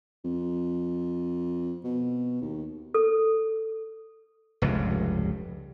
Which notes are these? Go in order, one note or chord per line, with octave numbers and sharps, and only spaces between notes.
F2
B2
D#2
A4
F1 C#2 G2